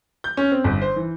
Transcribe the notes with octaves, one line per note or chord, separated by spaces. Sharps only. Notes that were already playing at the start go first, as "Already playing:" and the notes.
G6
C#4
C4
G1
C5
E3